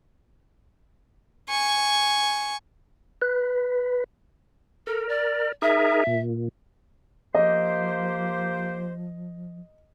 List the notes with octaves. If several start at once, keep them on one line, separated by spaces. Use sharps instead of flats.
G#5 C#6
B4
A4 A#4
D5
D#4 G#4 A#4 E5
A#2
F3 A#3 G4 C5 D#5